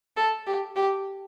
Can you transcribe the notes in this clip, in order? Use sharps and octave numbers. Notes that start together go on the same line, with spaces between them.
A4
G4
G4